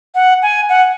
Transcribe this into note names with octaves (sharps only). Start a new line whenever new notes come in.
F#5
G#5
F#5